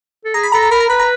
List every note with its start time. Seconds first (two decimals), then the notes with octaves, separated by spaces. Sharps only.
0.25 A4
0.34 G#4 A#5
0.43 B5
0.52 A4 A#5
0.63 A#5
0.71 A#4 B5
0.80 A#5
0.89 B4 B5
1.00 A#5